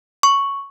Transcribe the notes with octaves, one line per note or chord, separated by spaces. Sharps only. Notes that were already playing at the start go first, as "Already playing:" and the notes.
C#6